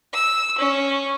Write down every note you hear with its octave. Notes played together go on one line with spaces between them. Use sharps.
E6
C#4